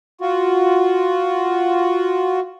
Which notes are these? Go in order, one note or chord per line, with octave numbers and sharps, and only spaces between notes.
F4 F#4